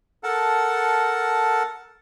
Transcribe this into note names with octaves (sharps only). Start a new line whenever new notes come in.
A4 A#4 F#5 A5